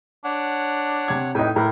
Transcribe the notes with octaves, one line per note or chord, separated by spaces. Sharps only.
D4 C#5 F#5
C3 G#6
A2 D#4 B4 G5 G#5
A2 E4 A#4 B4